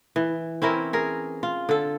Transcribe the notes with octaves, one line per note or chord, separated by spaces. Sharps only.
E3
C4 C#4 E4 A#4
G#4 A#4
F4
D3 A4